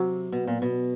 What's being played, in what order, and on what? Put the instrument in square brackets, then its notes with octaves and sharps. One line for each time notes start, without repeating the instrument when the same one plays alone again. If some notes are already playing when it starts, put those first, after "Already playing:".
Already playing: [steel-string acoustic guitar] C3 [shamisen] F#3
[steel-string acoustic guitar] B2
A#2
B2